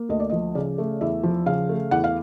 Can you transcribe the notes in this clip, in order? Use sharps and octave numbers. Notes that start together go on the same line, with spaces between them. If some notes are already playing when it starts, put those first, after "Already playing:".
Already playing: A#3
D2 D#5
D5
F3 D#5
C#3 D5
A3
E2 E5
F3
C#3 F5
A3
E2 F#5
F5